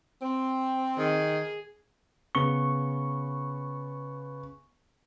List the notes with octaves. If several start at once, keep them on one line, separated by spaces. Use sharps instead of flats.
C4
D#3 G#4
C#3 B3 C#6 G7